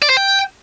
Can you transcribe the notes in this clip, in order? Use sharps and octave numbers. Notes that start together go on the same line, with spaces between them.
D5
C5
G5